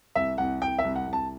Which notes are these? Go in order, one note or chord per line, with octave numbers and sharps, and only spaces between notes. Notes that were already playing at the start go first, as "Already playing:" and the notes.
C2 E5
C2 F#5
C2 G5
E5
C2
F#5
C2
A5